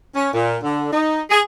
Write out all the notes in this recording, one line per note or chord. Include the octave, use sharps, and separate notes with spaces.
C#4
A#2
D3
D#4
G#4